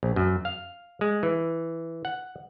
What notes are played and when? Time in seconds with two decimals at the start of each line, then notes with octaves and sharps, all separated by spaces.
0.03 A#1
0.16 F#2
0.45 F5
1.01 G#3
1.23 E3
2.05 F#5